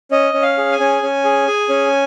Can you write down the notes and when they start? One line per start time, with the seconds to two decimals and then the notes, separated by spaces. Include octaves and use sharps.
0.11 C#4 D#5
0.34 C#4
0.42 F5
0.57 G#4
0.71 G#5
0.80 C#4
1.03 C#4
1.24 G#4
1.48 G#4
1.69 C#4